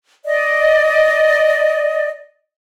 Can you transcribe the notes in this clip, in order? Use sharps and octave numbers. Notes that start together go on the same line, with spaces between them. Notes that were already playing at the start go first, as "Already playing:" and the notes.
D5 D#5